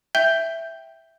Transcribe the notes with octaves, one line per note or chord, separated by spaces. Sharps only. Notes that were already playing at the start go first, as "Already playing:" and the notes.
E5 G5 G6 G7